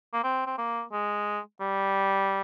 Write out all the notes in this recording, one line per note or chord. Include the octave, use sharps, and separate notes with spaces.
A#3
C4
C4
A#3
G#3
G3